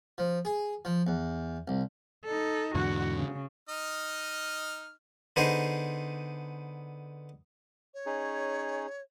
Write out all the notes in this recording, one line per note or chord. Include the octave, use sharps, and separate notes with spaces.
F3
G#4
F3
E2
C2
D#4 A4
E2 G#2 D3 F#4 F#5
C#3
D#4 D#5 F6
D3 B3 D#4 G#4 C5
C#5
C#4 D#4 G#4